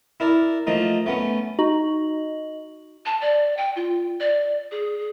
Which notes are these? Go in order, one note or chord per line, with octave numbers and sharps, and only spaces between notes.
E4 A#4 D5
F3 A3 A#3 D#4
A3 B3 C#4
D#4 F#4 D#5 F#7
A5
D5
G5
F4
D5
G#4